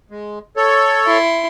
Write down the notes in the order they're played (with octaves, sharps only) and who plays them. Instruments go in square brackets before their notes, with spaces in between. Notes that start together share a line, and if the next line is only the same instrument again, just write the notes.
[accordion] G#3
A4 C#5
[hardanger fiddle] E4 C6